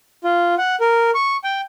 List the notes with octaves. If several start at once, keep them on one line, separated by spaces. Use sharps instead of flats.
F4
F#5
A#4
C#6
G5